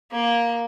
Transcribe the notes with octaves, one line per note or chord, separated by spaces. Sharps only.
A#3